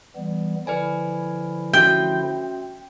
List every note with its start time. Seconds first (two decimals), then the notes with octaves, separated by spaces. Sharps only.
0.16 E3 G3 B3
0.67 D3 F3 E4 B4 D5 G#5
1.73 C#4 F#4 E5 G5